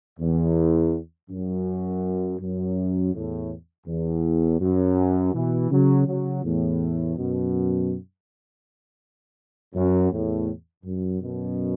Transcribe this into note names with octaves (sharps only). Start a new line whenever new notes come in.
E2
F#2
F#2
E2 A2
E2
F#2
B2 E3
C#3 F#3
C#3 F#3
E2 A2
F#2 B2
F#2
E2 A2
F#2
F#2 B2